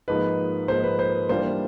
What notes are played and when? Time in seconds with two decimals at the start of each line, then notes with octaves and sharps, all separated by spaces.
0.08 G#2 F3 A#3 D#4 B4
0.68 G#2 F3 A#3 D#4 C5
0.83 B4
0.99 C5
1.29 E3 G3 A#3 D4 F4 C5